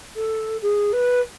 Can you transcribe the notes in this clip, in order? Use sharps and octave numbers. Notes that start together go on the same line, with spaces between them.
A4
G#4
B4